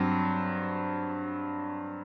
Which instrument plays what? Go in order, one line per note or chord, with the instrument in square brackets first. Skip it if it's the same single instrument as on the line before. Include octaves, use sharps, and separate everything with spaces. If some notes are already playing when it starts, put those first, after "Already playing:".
Already playing: [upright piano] G2 F#3 C4